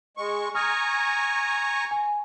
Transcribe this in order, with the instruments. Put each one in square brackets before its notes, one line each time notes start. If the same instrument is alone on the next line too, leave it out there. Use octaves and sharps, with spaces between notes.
[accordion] G#3 C#6
[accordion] G#5 A#5 C#6 [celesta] D#6 F6
[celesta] G#5